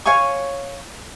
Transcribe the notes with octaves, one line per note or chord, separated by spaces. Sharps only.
C#5 F5 G#5 C#6